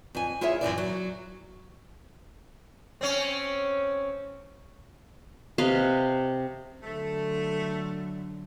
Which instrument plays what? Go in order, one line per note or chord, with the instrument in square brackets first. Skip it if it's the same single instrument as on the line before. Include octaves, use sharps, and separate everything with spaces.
[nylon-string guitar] F2 G#5
E4 F4 G#4 C#5 E5
F#2 C3 E3 D5
F#3
[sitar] C4 C#4
[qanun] C3 B4 D#5 F5
[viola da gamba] D3 F#3 [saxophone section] A3